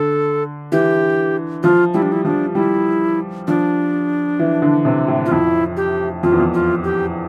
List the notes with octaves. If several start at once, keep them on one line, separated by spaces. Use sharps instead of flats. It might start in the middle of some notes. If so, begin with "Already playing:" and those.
Already playing: D3 A4
E3 G4
F3 F4
G3 E4
D4
E4
F3 D4
G3 E4
F3 D4
E3
D3
C3
A2
F4
F2 E4
G4
F2 F4
E2
F2
F4
G4